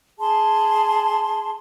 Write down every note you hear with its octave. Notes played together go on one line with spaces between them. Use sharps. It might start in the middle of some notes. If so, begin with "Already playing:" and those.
G#4 A5 C6